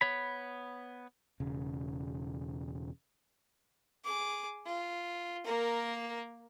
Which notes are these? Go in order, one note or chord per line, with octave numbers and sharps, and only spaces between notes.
B3 C#5 B5
E1 C#3
G#4 D6
F4
A#3 A#4